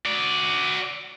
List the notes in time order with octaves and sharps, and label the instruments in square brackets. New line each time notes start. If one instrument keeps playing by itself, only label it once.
[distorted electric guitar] F#4 D5